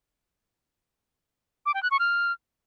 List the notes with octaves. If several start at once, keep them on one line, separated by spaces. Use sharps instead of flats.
D6
G5
F#6
C#6
F6